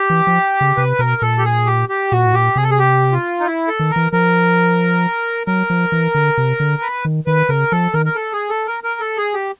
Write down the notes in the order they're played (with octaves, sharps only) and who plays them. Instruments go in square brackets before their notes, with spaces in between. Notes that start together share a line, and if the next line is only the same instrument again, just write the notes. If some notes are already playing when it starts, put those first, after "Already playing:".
Already playing: [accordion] G4
[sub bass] E3
F3
C#3
[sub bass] C3 [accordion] B4
[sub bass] B2 [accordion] A#4
[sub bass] A#2 [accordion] A4
[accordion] G4
G#4
G4
G4
[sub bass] A#2 [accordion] F#4
[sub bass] A2
[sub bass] A#2 [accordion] G4
[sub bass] C3 [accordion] G#4
[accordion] A4
G#4
G4
F4
D#4
E4
A4
[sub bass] D#3
[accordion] A#4
[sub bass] E3
[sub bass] F3 [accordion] A#4
[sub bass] F#3 [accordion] A#4
[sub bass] F3
E3
D3
C3
D3
[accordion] B4
[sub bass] D#3
[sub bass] D#3 [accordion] B4
[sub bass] C#3 [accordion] A#4
[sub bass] F3 [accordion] A4
[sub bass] D#3 [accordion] A#4
[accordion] A#4
A4
G#4
A4
A#4
A#4
A4
G#4
G4